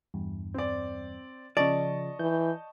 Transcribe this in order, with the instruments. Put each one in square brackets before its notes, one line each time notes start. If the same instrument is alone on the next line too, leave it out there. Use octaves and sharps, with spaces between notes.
[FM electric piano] E2 G2
[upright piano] C4 D5
[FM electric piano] C#3 F3 [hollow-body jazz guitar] D5 [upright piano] D#5 A5 C#6
[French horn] E3 [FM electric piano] G6